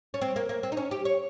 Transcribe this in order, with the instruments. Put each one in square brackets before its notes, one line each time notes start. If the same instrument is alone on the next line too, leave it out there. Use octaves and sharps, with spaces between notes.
[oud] C#4
C4
A#3
A#3
C4
D#4
C#4
G4
C#5